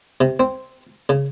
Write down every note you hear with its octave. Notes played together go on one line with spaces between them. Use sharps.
C3
C4
C#3